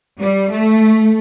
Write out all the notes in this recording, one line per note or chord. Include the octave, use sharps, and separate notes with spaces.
G3
A3